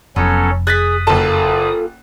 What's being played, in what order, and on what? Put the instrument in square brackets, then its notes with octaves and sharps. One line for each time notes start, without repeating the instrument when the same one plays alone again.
[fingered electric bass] F1 [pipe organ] F#3 C#4 A4 [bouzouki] B3
[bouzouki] G#4 [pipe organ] D#6 [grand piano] F#6 A6 B6
[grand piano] F#1 A5 [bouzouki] A#3 F4 A4